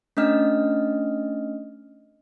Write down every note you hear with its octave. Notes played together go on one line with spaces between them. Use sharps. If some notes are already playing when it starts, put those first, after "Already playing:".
A3 C#4 D4 D#5 F6